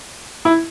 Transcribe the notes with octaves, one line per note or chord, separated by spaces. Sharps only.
E4